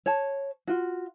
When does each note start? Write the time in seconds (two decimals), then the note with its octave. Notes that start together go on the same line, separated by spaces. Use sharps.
0.06 C#5 A5
0.68 F4 F#4